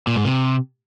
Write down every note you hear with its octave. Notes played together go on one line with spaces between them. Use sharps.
A#2
G#2
C3